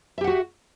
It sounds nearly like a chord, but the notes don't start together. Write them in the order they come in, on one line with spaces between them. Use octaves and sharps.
E5 G4 F#5 F#4